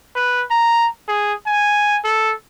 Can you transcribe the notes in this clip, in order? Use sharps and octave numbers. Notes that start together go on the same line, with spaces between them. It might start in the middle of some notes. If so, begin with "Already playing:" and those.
B4
A#5
G#4
G#5
A4